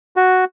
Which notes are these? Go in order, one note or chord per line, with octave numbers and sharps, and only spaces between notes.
F#4